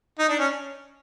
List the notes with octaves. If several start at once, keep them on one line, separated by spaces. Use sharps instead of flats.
D#4
D4
C#4